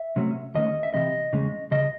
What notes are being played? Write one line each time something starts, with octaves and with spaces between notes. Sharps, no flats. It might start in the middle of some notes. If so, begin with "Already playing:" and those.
Already playing: E5
C3 F#3 A3 C#4
D#2 D#3 A3 C#4 D#5
E5
C2 C3 E3 C4 D#5
E2 C#3 G#3 C#4
C#2 C#3 D#5